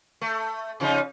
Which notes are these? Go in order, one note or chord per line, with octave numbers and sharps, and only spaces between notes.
A3
C#3 F3 D#4